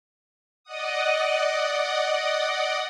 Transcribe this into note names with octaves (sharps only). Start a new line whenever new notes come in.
D5 D#5 F#5 D#6